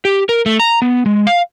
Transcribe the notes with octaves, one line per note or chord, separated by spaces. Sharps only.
G4
A#4
A3
A#5
B3
G#3
F5